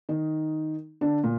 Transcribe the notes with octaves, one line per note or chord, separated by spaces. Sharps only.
D#3 D#4
D3 D4
A#2